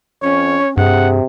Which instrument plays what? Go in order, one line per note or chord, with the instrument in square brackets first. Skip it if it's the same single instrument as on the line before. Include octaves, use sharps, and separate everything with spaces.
[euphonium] F2 [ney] C#4 [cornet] C#5
[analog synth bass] G2 [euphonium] C3 [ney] G#4 [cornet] F#5